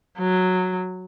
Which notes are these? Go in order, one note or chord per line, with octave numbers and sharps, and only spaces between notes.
F#3